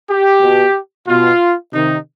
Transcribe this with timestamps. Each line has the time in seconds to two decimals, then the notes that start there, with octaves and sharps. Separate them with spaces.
0.09 G4
0.42 B2
1.07 B2 F4
1.73 C3 D#3 D#4